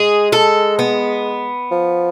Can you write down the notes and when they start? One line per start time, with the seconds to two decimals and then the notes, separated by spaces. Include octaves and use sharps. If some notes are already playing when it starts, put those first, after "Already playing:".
Already playing: G#3 G#4
0.32 A4
0.79 B3
1.71 F3